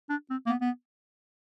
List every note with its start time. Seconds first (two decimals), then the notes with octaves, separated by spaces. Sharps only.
0.10 D4
0.30 C4
0.46 A#3
0.49 B3
0.61 B3